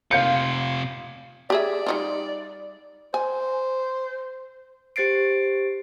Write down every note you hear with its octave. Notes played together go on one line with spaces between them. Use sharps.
C3 F4 F5 G6 C#7
G4 G#4 D5 E5
G3 D#4 F4
C5 G#5
G4 C5 A6 C7 D7